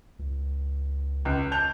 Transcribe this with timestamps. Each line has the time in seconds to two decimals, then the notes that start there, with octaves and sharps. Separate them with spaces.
0.19 C#2
1.25 C#2
1.52 A5 G6 F7